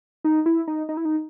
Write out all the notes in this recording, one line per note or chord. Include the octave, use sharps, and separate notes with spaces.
D#4
E4
D#4
D#4
E4
D#4